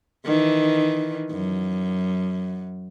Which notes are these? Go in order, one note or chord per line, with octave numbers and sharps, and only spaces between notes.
D#3 E3
F#2